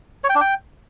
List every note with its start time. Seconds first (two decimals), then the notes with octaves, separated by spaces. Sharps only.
0.24 C#5
0.30 G5
0.35 D4
0.41 G5